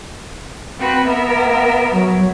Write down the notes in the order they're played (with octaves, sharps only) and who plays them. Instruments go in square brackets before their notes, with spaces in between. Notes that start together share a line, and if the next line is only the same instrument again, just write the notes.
[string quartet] C4 F#4 B4
B3 A#4 E5
[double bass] F#3